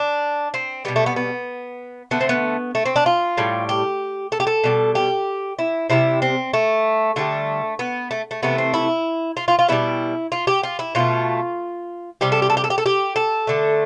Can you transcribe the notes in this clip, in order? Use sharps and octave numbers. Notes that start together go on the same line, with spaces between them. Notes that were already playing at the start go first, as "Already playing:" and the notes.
Already playing: D4
C4
B2 G3 B3
A3
B3
B3
D3 A3 B3
C4
B3
A3
C4
D4
F4
A2 G3
G4
A4
G4
A4
B2 G3
G4
E4
C3 G3 E4
C4
A3
D3 G3 A3
B3
A3
A3
C3 E3 A3 B3
C4
E4
F4
F4
F4
B2 G3 E4
F4
G4
F4
E4
B2 A3 F4
C3 G3 G4
A4
G4
A4
G4
A4
G4
A4
G4
A4
D3 A3